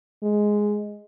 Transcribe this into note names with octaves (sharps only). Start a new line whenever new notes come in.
G#3